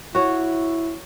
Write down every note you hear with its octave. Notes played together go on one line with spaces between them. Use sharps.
E4 F#4 C#5